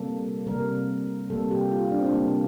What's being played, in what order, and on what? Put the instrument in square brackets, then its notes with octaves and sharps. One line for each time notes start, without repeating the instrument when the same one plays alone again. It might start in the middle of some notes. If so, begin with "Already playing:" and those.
Already playing: [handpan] C3 G3 A#3 A4
C3 G3 A#3 A#4
C3 G3 A#3 A4
G4
F4
D4
C4
D4
C3 G3 A#3